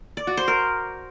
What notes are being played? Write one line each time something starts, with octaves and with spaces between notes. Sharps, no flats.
D5
F#4
C5
A#4